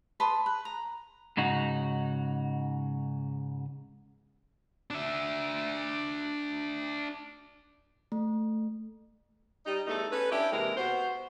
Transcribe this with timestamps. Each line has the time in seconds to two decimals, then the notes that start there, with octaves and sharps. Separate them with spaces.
0.20 B4 A5 C6 D#6
0.46 B4
0.65 A#5
1.37 G#2 C#3 D#4 F#4
4.91 D4 E5
8.12 A3
9.65 G3 D#4
9.87 E2 G3 A3 D#4 A4
10.12 C#4 A4 B4
10.32 C#4 D4 E4 G4
10.52 D#2 C3 E3 G#3 A#4
10.77 B3 F#4 C5